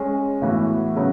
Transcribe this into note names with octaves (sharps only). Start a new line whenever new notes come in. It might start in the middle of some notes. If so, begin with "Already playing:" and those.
Already playing: G#3 C#4 G#4
A2 E3 B3 F#4
C#3 F#3 B3